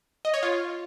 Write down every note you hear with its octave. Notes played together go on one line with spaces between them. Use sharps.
D#5
C#5
F4